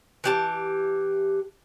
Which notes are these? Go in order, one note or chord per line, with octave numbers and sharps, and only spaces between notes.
E3 G4 A5